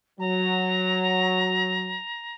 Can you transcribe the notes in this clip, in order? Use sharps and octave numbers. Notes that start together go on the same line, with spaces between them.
F#3 A#5